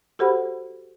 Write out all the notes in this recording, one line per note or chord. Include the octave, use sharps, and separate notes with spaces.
F#4 G4 A4 C5 F#5 B5